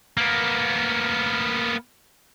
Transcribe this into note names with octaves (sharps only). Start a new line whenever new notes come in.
A#3 B3